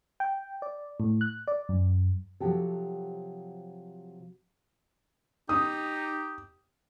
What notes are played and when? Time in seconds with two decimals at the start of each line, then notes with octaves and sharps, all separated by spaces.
0.20 G5
0.62 D5
1.00 A2
1.21 F#6
1.48 D5
1.69 F#2
2.40 C3 F3 F#3 F#4 G4 A4
5.49 D#4 G4 D#6